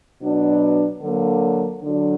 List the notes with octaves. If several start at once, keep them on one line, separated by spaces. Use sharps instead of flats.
B2 F#3 B3 D4
D3 F#3 A#3
D3 F#3 D4